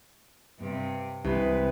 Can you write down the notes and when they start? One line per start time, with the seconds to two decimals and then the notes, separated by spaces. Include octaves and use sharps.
0.60 G2 C3
1.24 C2 G#3 B4